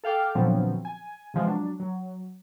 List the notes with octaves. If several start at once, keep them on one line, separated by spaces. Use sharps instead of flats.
A4 F5 G5 D6
A#2 D3 F3 F#3 B3 C4
G#5
C3 E3 F3 G#3
F#3 D4
F#3